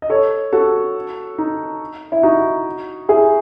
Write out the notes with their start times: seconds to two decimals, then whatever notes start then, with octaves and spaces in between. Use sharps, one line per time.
0.02 D#5
0.10 A4 C#5
0.53 F#4 A4
1.38 D#4
2.12 E4
2.23 D#4 F#4
3.09 E4 G#4